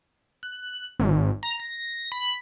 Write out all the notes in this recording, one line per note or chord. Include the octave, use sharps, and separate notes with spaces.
F#6
G#1
A#5
A#6
B5